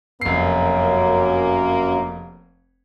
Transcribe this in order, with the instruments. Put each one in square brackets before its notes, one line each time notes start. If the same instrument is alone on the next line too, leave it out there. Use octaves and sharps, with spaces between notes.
[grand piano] F1 C7 [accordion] F#2 [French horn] A#3